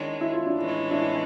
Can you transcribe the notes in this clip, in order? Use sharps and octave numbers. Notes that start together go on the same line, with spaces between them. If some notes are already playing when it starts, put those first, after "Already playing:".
Already playing: D#3 G#3 C#4 D4 E4
E4
F4
D4 E4
A2 E3 G#3 C#4
D4 E4